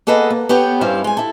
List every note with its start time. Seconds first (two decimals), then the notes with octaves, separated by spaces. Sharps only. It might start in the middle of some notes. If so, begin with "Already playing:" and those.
0.07 A#3 G#4 A4 B4 D#5 F#5
0.30 A#3
0.49 B3 G4 C#5 G5
0.81 G2 G3 C#4 E4 C5 F5
1.04 G#3 G#5
1.17 E4 A4